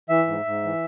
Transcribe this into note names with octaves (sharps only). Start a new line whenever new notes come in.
E3 E5
G#2
G#2
E3